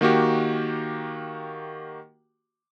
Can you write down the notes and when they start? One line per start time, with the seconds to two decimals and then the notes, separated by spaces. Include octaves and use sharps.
0.01 D#3 A#3 F#4 G4